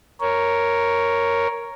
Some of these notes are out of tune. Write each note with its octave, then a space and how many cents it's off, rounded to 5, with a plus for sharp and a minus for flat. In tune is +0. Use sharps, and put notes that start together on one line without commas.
A#4 +0 C#5 +0